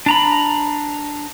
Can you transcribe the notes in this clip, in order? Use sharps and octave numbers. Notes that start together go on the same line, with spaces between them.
D4 A#5 B5